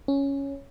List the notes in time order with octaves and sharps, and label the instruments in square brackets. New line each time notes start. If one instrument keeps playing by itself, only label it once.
[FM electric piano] C#4